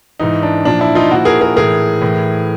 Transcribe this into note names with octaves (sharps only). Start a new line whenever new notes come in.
G#2 E3 D#4
D4
A#2 F3 D4
D4 E4
D#4 F4
A#2 F3 E4 F#4
G#4 A#4
G#4 A#4
A2 E3 G#4 A#4
A2 E3